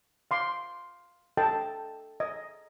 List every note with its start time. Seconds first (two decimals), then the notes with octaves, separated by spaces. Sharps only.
0.31 F5 C6 D6
1.37 A4 D#5 G5 A5
2.20 D#5